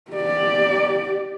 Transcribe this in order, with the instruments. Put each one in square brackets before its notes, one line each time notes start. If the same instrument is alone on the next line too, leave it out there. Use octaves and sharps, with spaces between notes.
[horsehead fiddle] G4 D5